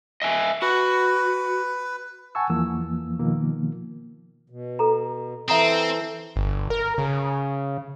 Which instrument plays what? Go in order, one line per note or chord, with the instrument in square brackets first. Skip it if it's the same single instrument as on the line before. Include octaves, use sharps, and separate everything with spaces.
[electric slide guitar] D#5 E5 G#5
[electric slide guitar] F#4 [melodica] B4
[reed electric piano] F#5 G#5 A5 C#6 E6
E2 E3 F3 A#3 E6
B2 D#3 F3 A#3
[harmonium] B2
[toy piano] A4 A#5
[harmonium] E3 A4 [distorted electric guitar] C4 [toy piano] E5 A#5 D#6
[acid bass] G1
A#4
C#3